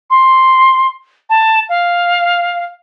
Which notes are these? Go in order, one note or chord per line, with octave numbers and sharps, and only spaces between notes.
C6
A5
F5